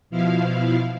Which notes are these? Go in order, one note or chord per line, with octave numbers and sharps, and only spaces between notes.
B2 F3 E4 F5